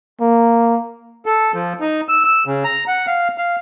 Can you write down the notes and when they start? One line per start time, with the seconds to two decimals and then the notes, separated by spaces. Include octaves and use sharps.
0.21 A#3
1.26 A4
1.54 F3
1.80 D#4
2.09 E6
2.25 E6
2.46 C#3
2.64 A#5
2.88 F#5
3.07 F5
3.38 F5